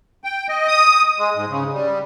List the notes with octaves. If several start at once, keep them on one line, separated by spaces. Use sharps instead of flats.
G5
D#5
D#6
G#3
G#2
C#3
G3